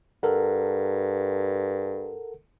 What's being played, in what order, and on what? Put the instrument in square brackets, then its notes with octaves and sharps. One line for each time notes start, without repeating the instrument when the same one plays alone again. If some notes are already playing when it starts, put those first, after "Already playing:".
[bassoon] G2 [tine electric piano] A4 A#4 F#5